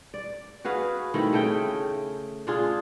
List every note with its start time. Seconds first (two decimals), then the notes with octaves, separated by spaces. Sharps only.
0.14 D5
0.65 F#4 G#4 B4 F5
1.14 D#3 A3 C4 E4
1.33 C#3 A3 G#4 G5
2.47 D4 F4 G#4